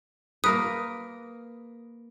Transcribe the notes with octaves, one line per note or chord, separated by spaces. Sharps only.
A#3 A#4 B4 D#6